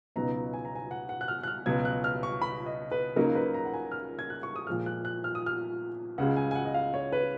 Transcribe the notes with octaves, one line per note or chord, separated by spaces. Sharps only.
C#2 B2 F#3 B3 D#4 A#5
G#5
A#5
G#5
F#5
F#5
F#6
F6
F#6
F6
C#2 B2 F#3 G#6
F#6
F6
C#6
B5
D#5
B4
C#2 C#3 F#3 A#3 D#4 A#4
B4
A#5
F#5
G#5
F6
G#6
F#6
C#6
D#6
A#2 F3 G#3 F6
F#6
F#6
F6
D#6
F6
C#2 C#3 G#3 F#5
G#5
G#5
F#5
D#5
F5
C#5
B4